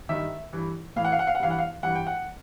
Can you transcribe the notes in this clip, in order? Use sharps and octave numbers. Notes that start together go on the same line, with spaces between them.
G2 D#3 E5
G2 E3
A2 E3 F5
F#5
F5
F#5
F5
F#5
G2 E3 F5
F#5
F5
G2 E3 F#5
G5
F#5